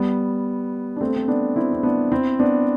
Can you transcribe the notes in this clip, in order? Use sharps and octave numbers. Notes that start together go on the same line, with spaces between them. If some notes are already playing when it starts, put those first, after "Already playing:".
Already playing: G3 B3
D4
A3 C4
C4
B3 D4
C4 E4
C4
B3 D4
C4 E4
B3 D4